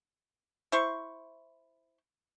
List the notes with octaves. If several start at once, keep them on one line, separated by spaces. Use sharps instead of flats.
E4 C5 C#6